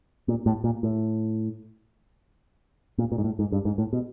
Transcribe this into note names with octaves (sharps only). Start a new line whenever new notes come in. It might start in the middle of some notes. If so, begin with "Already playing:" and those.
A#2
A2
A#2
A2
A#2
A#2
G#2
A2
G#2
G2
G#2
A2
B2